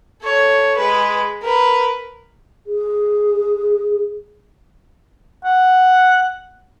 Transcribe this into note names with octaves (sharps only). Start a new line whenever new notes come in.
A4 C#5
G#3 B4
A#4 B4
G#4
F#5